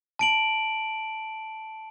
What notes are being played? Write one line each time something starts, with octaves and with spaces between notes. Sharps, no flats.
A5 D7 F#7